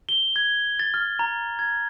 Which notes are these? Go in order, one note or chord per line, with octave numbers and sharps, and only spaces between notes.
G7
G#6
A6
F6
A#5
G#6